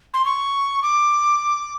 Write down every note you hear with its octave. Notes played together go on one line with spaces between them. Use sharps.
C6
C#6
D6